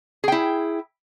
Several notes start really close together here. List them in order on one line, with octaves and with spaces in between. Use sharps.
G#4 G5 E4